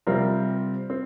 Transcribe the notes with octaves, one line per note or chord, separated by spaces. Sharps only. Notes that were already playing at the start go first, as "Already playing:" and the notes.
C3 G3 C4 F4 A#4
C4